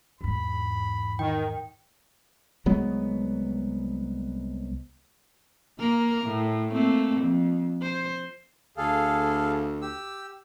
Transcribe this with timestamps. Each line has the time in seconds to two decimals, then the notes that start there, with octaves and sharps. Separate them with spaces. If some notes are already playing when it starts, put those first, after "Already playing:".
0.21 E2 G#2 B5
1.19 D#3 G5
2.66 C2 F#3 G#3 B3
5.79 A#3 A#4
6.25 A2
6.71 A3 A#3 C4
7.22 F2
7.82 C5
8.77 D2 G#4 A4 F5
9.82 G4 E6